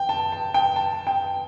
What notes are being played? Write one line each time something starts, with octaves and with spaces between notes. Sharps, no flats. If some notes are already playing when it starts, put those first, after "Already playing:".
Already playing: G5
A5
A5
G5
A5
G5